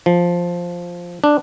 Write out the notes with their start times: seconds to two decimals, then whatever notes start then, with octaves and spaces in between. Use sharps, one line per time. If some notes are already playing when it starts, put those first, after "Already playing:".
0.06 F3
1.24 D4